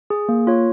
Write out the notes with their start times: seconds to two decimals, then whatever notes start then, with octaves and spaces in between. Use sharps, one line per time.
0.10 G#4
0.29 A#3
0.47 F4 C#5